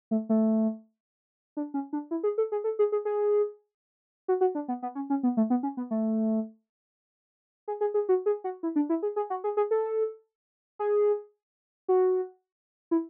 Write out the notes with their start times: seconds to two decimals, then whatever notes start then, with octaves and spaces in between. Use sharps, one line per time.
0.11 A3
0.29 A3
1.57 D4
1.74 C#4
1.93 D4
2.11 E4
2.23 G#4
2.38 A4
2.52 G#4
2.64 A4
2.79 G#4
2.92 G#4
3.05 G#4
4.28 F#4
4.41 F#4
4.55 D4
4.68 B3
4.82 B3
4.95 C#4
5.10 C#4
5.23 B3
5.37 A3
5.50 B3
5.63 C#4
5.77 B3
5.91 A3
7.68 G#4
7.81 G#4
7.94 G#4
8.09 F#4
8.26 G#4
8.44 F#4
8.63 E4
8.76 D4
8.89 E4
9.03 G#4
9.16 G#4
9.30 F#4
9.44 G#4
9.57 G#4
9.71 A4
10.79 G#4
11.88 F#4
12.91 E4